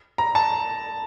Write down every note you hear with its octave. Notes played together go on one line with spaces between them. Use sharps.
A#5
A5